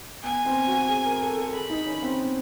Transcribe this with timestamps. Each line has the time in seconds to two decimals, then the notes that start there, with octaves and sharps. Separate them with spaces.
0.23 B3 G#5
0.45 C4
0.67 F#4
0.89 G#4
1.05 A#4
1.21 A4
1.37 A4
1.54 G#4 B5
1.70 D#4
1.86 C#4
2.02 C4
2.19 B3